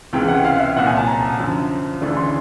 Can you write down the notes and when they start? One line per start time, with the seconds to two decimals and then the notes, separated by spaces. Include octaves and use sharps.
0.13 C#2 C3 E3 G#3 G5
0.28 F#5
0.45 F5
0.60 E5
0.76 C2 A#2 F#3 F#5
0.87 G#5
0.97 A5
1.07 A#5
1.39 F#2 D3 F3
2.01 D2 C#3 E3 A3 D4
2.17 C6